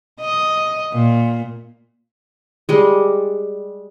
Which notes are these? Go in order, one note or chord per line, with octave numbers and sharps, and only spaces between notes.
D#5
A#2
G3 G#3